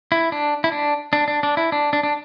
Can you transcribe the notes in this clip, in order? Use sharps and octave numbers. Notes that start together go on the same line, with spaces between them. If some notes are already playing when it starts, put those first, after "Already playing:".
E4
D4
E4
D4
D4
D4
D4
E4
D4
D4
D4